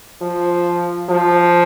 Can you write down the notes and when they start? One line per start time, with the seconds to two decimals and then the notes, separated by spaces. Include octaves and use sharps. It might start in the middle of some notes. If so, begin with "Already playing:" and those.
0.21 F3
1.10 F3